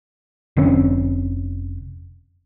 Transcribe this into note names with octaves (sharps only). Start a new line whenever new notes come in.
F1 D3 C4 C#4